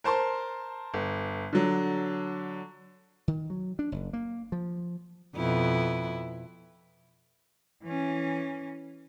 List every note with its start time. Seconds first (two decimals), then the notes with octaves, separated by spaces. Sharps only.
0.04 A#4 C5 A5 C6
0.94 G1
1.53 D3 F#3
3.28 D#3
3.50 F#3
3.79 D4
3.92 F#1
4.13 A#3
4.52 F3
5.36 F2 B2 E4
7.83 E3 C#4